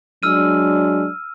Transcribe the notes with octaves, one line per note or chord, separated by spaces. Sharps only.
F#3 G#3 D4 E6 F6 D#7